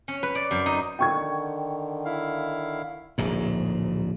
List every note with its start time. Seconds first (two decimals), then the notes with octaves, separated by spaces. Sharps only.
0.08 C#4
0.23 B4
0.35 D5
0.51 F#2
0.66 D#4
0.99 D3 D#3 G5 C#6 G#6
2.05 E4 F5
3.18 D1 A#1 G#2